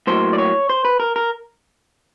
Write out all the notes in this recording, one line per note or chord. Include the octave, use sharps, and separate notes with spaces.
A2 F#3 A#3 C5
D5
C#5
C5
B4
A#4
A#4